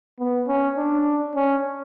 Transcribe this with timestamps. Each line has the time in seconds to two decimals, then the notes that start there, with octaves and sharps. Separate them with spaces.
0.19 B3
0.48 C#4
0.77 D4
1.36 C#4